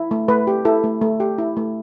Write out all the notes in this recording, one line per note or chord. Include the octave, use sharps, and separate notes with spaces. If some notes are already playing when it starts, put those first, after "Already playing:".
Already playing: E4
A3
A3 B4
G4
E4 A4
A3
A3
G4
E4
A3